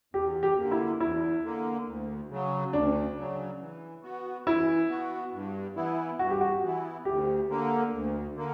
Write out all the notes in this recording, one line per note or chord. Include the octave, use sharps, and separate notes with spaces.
E2 G4
G4
D3 A#3
E4
E2 E4
D3 A#3
D2
C#3 F#3
D2 D4
C#3 F#3
E3
B3 F#4
E3 E4
B3 F#4
G2
E3 B3 E4
G2 F#4
G4
F#4
E3 B3 E4
D2 G4
D3 A#3
D2
D3 A#3